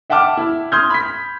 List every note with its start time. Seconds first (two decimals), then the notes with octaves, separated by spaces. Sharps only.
0.10 E5 F#5 G5 A5 D6 F6
0.37 E4
0.72 C6 D#6 F6 G6 G#6
0.90 B5 B6